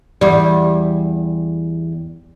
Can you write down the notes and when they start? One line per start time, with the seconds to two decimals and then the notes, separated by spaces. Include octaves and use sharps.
0.21 E2 G3